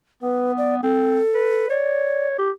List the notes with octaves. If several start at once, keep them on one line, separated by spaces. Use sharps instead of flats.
B3 B4
D5
C4 A4
B4
C#5 D5
G4